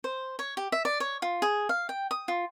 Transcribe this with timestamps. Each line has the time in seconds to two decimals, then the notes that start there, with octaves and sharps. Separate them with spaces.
0.04 C5
0.39 C#5
0.57 G4
0.72 E5
0.85 D5
1.00 C#5
1.22 F4
1.42 G#4
1.69 F5
1.89 G5
2.11 D#6
2.28 F4